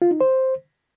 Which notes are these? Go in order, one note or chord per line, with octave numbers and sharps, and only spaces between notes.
F4
D#4
C5